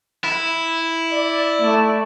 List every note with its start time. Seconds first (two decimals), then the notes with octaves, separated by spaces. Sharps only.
0.24 E4
1.11 D5
1.62 A3